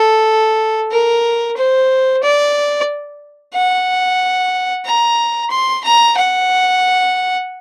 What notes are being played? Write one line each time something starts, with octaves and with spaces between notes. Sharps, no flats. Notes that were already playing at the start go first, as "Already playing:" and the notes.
Already playing: A4
A#4
C5
D5
F#5
A#5
C6
A#5
F#5